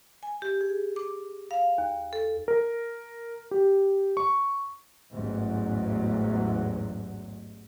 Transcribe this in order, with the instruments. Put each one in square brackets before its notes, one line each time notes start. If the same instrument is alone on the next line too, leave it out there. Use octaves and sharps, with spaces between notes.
[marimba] G#5
G4
G#4
D6
F5
D#2
A4
[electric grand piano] A#4
G4
C#6
[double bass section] A1 E2 G#2 F#3